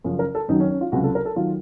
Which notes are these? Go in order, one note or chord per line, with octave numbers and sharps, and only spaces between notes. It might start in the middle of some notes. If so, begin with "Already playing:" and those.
F#2 C#3 F3
A#4
A4
F#2 D#3 F#3 D#4
C#4
C#4
F4
C#2 C3 F#3 F#4
A4
A#4
A4
D#3 F#3 F4